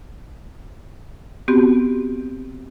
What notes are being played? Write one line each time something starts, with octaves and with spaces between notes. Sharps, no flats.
B3 C4 F#4 G4